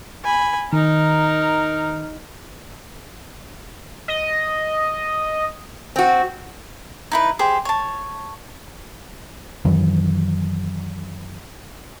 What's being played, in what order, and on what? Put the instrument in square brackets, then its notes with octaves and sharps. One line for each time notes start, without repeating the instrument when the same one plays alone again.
[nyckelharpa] G#5 B5
[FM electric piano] D#3 [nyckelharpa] D#4 [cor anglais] A#4
[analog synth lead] D#5
[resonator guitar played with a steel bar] C4 F#4
[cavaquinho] D#4 E4 B4
G4 G#4 C5
C#5 A5
[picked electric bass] F#2 D#3 E3 F#3